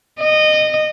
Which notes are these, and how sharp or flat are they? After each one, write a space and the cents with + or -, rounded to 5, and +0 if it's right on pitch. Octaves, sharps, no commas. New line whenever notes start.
D#5 -20